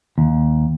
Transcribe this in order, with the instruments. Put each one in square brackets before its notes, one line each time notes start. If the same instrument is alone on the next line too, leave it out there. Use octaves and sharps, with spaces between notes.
[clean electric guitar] D#2